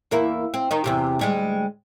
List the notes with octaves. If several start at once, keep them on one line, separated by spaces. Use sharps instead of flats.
E2 A#3 E4
C4
D#3 D#4
E2 C3 G4
D2 G3 G#3